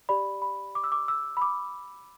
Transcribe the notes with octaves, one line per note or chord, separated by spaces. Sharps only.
G4 D5 B5
B5
D6
E6
D6
E6
B5
D6